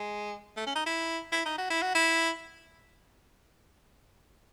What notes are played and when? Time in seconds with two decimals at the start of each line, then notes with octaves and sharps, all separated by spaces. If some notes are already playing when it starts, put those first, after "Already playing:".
Already playing: G#3
0.57 A3
0.66 C#4
0.75 D#4
0.86 E4
1.32 E4
1.45 D#4
1.58 F#4
1.70 E4
1.82 F#4
1.95 E4